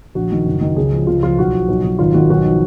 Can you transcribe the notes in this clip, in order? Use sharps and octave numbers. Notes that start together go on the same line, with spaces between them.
A#1 F#4
D#3
F#1
D#3
C#2 G#4
F3
C#2 F4
F3 F4
B1 F#4
F3
B1
B1
G#1 F4
D#3 F#4
B1 F#4
F3